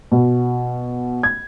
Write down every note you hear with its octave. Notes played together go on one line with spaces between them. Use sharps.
B2
G#6